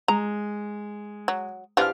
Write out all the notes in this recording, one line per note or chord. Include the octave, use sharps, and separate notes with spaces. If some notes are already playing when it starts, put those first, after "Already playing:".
G#3 A#5
F#3
E3 F3 D4 G4 F5 F6